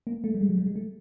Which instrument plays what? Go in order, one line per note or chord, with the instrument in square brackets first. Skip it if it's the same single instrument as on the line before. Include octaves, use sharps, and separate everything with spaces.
[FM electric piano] A#3
A3
G3
G#3
F#3
G3
G#3
A3